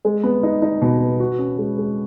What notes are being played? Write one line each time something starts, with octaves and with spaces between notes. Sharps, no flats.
G#3
B3
D#4
D#4
B2
B3
F#4
C#4
G#3
G#3